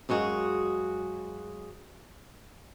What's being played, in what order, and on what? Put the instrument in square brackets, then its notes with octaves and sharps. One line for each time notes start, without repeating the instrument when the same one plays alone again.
[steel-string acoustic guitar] F#2 G#3 F#4 G#4 F5